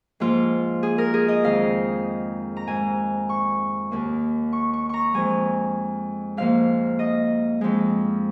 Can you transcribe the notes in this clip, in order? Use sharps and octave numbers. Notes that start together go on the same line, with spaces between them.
G#2 F3 A#3 F4
G#4
A#4
G#4
D#5
F2 D#3 G#3 F5
A#5
G#2 G#3 G#5
C#6
D#2 D#3 A#3
C#6
C#6
A#5 C#6
F2 F3 G#3 G#5
G#2 F3 A#3 F5
D#5
F2 F3 G#3